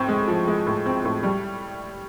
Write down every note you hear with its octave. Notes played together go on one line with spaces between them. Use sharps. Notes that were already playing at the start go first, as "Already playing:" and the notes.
Already playing: A2 C4
G#3
F3
G#3
A2
C4
A2
G3